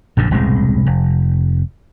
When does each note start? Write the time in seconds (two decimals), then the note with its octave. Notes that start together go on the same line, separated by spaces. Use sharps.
0.17 A#1 F#2 D3
0.31 E1 C2 A2 G#3
0.86 F1